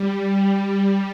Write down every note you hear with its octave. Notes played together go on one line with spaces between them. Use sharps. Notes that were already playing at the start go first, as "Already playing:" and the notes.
Already playing: G3